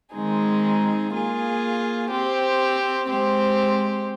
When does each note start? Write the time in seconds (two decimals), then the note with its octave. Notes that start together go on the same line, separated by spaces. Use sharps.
0.14 D#3 G#3 C4 D#4 G#4
1.13 A#3 F4 G#4
2.11 C4 G4 C5
3.10 G#3 C4 G4 C5